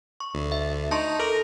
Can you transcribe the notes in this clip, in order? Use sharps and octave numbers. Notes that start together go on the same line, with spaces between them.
C#6
D2
E5
D#4 A5 C6 C#6
A4 A#4